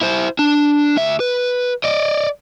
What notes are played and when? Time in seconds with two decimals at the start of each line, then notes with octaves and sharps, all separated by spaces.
0.01 E4 C5
0.39 D4
0.97 D2 E5
1.20 B4
1.84 D5 D#5